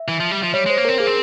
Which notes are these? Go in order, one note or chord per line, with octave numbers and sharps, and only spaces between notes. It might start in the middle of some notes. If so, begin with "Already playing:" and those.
Already playing: E5
E3
F3
G3
F3
G3 C#5
G#3 C5
A#3
C4 A#4
A#3 G#4
C4